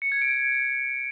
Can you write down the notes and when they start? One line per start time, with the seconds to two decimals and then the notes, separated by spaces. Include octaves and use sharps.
0.02 C#7
0.12 G#6
0.22 D7